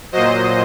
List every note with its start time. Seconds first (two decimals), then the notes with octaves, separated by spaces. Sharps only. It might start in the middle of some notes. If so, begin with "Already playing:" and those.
0.12 A#2 F#3 C5 D#5